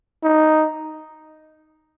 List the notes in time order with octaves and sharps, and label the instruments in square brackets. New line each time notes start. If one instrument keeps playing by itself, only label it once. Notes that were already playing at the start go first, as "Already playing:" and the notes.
[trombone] D#4